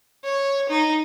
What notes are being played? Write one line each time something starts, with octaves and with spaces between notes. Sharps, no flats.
C#5
D#4